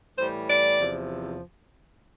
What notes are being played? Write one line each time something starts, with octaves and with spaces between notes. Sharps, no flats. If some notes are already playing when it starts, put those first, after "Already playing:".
A2 E3 G3 C5
D5
E2 C3 F3